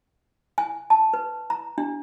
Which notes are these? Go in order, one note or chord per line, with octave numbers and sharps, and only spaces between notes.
G#5
A5
B4
A#5
D4